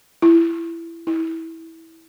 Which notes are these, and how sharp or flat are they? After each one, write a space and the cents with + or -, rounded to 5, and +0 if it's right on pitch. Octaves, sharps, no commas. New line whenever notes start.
E4 +20
E4 -15